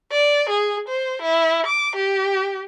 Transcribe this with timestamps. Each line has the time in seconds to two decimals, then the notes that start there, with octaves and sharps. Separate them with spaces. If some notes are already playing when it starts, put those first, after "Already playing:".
0.12 D5
0.50 G#4
0.89 C5
1.22 E4
1.66 D6
1.96 G4